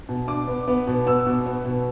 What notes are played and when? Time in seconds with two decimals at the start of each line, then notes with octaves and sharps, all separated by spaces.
0.09 B2
0.28 D4 D6
0.48 B3
0.68 B3
0.87 B2
1.06 B3 E6
1.26 B2
1.46 B3
1.65 B2